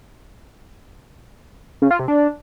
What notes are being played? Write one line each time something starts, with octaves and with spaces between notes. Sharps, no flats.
C#3
F4
C3
D4